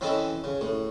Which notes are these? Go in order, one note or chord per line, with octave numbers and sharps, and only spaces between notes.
E3 C4 C#4 E4 A4 D#5
C#3
A2